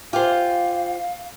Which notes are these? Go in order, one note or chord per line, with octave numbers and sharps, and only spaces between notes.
F4 G4 G#4 C5 F5